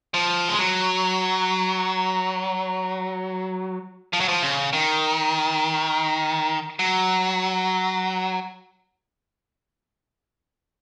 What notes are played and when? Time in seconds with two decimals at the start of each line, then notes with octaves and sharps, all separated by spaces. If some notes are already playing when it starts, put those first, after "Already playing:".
0.14 F3
0.48 G#3
0.58 F#3
4.13 F3
4.20 F#3
4.28 F3
4.42 C#3
4.73 D#3
6.79 F#3